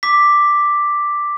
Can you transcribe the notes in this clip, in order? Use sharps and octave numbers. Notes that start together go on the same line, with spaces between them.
D6 B6